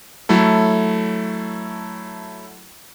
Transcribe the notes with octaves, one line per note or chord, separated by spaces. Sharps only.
F#3 A3 E4 A4